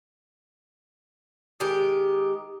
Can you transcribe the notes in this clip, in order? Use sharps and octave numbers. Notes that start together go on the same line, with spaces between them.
D#3 G#3 G4